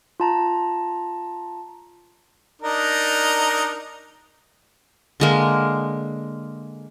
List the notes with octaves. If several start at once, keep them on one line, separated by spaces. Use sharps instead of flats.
F4 A5 A#5
D4 D#4 A#4
D3 G#3 A#3